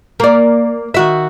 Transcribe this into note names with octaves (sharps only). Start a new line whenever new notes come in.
A#3 D5
D#3 F#4 E5